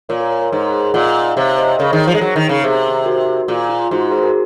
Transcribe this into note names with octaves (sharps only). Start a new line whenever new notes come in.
A#2 A#4 C#5
A#4 C#5
A#4 C#5
A#4 C#5
G#2
A#2 D#5 F#5
C3 C#5 F5
C5 D#5
C#3 A#4 C#5
D#3
F3
G#3
F#3
D#3
C#3
C3
F#4 A#4
A#2 G#4
F4
G#2 F#4
G#4
G#4 C5
F#4 A#4